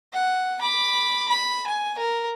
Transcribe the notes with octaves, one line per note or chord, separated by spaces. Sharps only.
F#5
B5 D6
B5
G#5
A#4